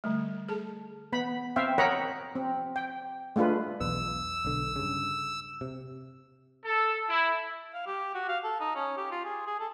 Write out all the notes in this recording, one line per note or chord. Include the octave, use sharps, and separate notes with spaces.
D3 G3 A3
G#4 A4 A5
B3 B5
C4 C5 E5 F5 G5
A#4 C#5 D#5 F#5 A#5 B5
C4
G5
G#3 A3 D4 F4 B4
B1 E2 B3 E6
B1 D3
G2 C#3
C3
A4
E4
F5
G4
F#4
F5
A4
D#4
C#4
G4
F4
G#4
G#4
A4